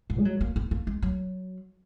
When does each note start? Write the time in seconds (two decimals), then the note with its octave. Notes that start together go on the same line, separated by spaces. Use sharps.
0.10 G#2
0.18 G#3
0.25 F#3
0.41 A#3
0.56 B3
0.71 A#3
0.87 G#3
1.02 F#3